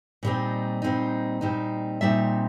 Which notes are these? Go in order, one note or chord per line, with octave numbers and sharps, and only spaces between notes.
A#2 G3 C4 D#4
A#2 G3 C4 D#4
A#2 G3 C4 D#4
A#2 G3 C4 D#4 E5